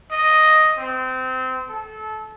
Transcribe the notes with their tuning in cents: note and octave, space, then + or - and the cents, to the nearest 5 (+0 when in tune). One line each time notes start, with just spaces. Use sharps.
D#5 +0
C4 -25
A4 -25